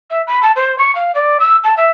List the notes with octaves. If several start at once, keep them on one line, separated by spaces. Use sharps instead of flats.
E5
B5
A5
C5
C#6
F5
D5
E6
A5
E5